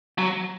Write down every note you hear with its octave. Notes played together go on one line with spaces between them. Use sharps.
F#3